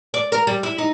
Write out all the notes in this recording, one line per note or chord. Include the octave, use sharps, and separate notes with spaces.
D5
A#4
G3
E4
D#4